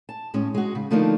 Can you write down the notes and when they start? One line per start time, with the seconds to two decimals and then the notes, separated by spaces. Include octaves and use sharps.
0.09 A5
0.34 A2 G#3 C#4
0.54 G#3 F#4
0.75 C#3
0.91 D3 F3 A3 A#3 D4 D#4